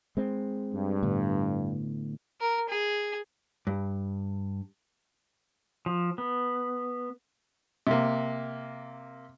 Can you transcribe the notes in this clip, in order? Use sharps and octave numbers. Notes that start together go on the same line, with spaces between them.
G#3 C4
G2
A2 D3 B3
A#4
G#4
G2
F3
B3
C3 A#3